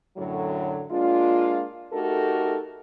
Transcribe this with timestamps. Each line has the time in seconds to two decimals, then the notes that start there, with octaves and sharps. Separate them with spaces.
0.16 F#2 A2 D3 F#3
0.90 G#3 A#3 D4 F4
1.92 A3 D#4 F#4 G4 A4 A#4